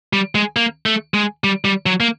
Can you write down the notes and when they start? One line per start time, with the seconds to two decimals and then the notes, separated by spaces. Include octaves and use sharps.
0.13 G3
0.35 G#3
0.56 A#3
0.86 A3
1.14 G#3
1.44 G3
1.65 G3
1.86 F#3
2.00 A#3